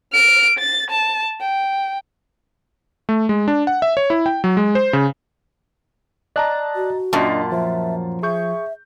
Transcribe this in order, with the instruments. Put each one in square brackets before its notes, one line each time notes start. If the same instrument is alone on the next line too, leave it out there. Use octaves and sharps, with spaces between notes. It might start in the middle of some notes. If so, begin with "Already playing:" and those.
[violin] F6 D7
A6
A5
G5
[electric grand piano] A3
G#3
D4
F#5
E5
C#5
E4
G5
F#3
G#3
C5
C#3
[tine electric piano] D5 F#6 [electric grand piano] D#5 A5 A#5
[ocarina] F#4
[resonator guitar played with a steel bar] F#2 A#2 [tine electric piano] D4 D#5 [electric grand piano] A5
[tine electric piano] F3 [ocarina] E5
[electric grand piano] G#4 C#6 G6 [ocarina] E5